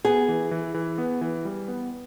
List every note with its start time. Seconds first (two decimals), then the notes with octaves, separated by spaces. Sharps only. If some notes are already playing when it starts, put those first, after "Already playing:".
0.05 B3 G#4
0.28 E3
0.51 E3
0.74 E3
0.98 B3
1.21 E3
1.45 G3
1.68 B3